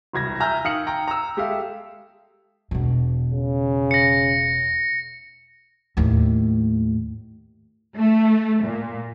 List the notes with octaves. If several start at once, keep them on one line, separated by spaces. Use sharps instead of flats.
E1 C2 G#6 A#6
E5 G#5 A#5 E6 F6 G6
D#3 F5 D#6 F6 C#7 F#7
G5 A#5
A#5 E6
G#3 G4 A4 E5 F5
E1 B2
C#3
A#6 C#7
D#2 A2
A3
A#2